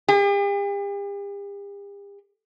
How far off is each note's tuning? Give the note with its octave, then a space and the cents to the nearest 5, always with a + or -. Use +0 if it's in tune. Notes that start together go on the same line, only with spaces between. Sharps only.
G4 +45